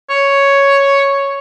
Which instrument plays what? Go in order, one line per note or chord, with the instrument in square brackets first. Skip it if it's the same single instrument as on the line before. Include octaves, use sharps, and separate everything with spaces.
[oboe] C#5